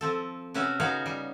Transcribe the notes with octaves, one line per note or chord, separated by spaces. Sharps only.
F3 C4 A4
C3 C#4 F#4 B4 E5
C#3 B3 D#4 F#4 C#5 F5
G3